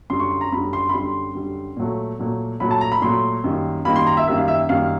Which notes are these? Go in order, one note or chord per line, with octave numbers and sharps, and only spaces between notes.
F#2 D3 G3 C6
C#6
C6
A#5
F#2 D3 G3 B5
C6
B5
F#2 D3 G3 C6
F#2 D3 G3
A#2 F#3 A3
A#2 F#3 A3
A#2 F#3 A3 B5
A5
A#5
B5
A#2 F#3 A3 C6
F#2 D#3 G3 A#3
F#2 D#3 G3 A#3 B5
C6
A#5
E5
F#2 D#3 G3 A#3 E5
F5
E5
F#2 D#3 G3 A#3 F5